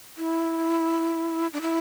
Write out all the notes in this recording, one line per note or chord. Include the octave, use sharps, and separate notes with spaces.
E4
D4
E4